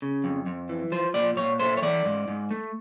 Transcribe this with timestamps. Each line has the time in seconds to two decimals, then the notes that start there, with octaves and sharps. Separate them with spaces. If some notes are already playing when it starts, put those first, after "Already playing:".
0.02 C#3
0.24 F2
0.46 F2
0.69 E3
0.92 F3 C5
1.14 A#2 D5
1.37 A#2 C#5
1.60 A3 C5
1.77 C#5
1.82 E3 D5
2.05 G#2
2.28 G#2
2.51 A3